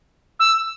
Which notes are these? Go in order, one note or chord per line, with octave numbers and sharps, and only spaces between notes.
E6